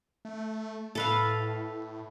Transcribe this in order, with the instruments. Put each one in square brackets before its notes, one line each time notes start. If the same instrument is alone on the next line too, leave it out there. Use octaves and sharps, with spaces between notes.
[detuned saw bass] A3
[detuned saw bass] A2 [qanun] A4 B4 F5